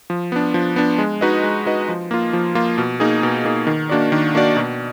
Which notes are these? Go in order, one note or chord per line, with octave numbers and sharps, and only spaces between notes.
F3
B3 D4
F3
B3 D4
G#3
D#4 F#4 B4 D#5
G#3
D#4 F#4 B4 D#5
F3
A#3 F4
F3
A#3 F4
B2
A#3 D#4 G#4
B2
A#3 D#4 G#4
D#3
A#3 D4 F#4 D5
D#3
A#3 D4 F#4 D5
B2